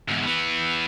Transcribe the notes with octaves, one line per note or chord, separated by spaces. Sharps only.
E2 G#2
E3 B3